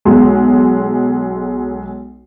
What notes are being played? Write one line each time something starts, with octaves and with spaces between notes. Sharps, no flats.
B1 G#3